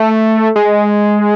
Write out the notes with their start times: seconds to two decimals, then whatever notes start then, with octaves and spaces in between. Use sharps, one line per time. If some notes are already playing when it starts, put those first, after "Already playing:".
Already playing: A3
0.56 G#3